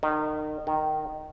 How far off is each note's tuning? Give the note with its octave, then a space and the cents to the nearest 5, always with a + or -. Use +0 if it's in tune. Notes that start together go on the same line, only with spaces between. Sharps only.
D#3 -30
D#3 -10